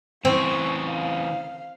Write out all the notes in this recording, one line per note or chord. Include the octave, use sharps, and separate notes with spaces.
C#3 E3 C4 C#6
F5